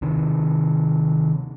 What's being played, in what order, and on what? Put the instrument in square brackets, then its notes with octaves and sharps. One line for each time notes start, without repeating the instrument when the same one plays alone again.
[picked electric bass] C3 D#3